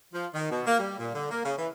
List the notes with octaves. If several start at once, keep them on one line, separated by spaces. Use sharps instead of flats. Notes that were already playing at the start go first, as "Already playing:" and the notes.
F3
D#3
B2
A#3
G3
A#2
D3
A#3
C#3
E3